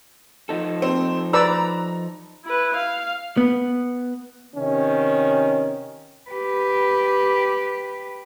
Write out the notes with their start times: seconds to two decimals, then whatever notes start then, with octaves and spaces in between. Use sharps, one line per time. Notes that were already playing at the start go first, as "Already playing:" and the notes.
0.49 F3 D#4 A4
0.82 C4
1.33 B4 D5 A#5 E6
2.45 E4 B4
2.76 F5
3.37 B3
4.56 C3 D#3 C#4
6.30 G4 B4